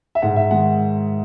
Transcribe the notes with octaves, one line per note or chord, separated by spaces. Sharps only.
E5
G#2 F#5
E5
D#3 G#3 F#5